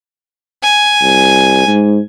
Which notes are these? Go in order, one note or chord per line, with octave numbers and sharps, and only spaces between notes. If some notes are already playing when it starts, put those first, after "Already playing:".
G#5
C2
G#2